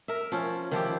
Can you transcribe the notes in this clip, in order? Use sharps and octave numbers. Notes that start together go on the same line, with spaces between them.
A#4 E5
F3 C#4
D#3 F3 E4 G4